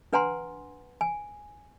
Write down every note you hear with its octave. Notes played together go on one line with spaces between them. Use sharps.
D4 B4 F#5 G#5 A#5 C6
G#5